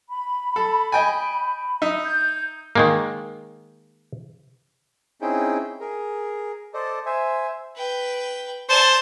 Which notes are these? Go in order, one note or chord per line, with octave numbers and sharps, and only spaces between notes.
B5
A4
D#5 G5 G#5
D#4 E5
G6
D#3 G#3 A#3
C4 C#4 D#4 E4 G#4 G5
G#4 A#4
A4 C5 D5 D#5
C5 E5 G#5
B4 G5
C5 D5 A5